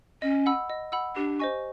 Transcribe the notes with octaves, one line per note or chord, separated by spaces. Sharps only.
C#4 D#5
F#5 B5 E6
D#5
F#5 B5 E6
D4 G4
C5 D#5 G#5 C#6